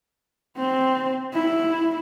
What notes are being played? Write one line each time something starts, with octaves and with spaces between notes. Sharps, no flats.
C4
E4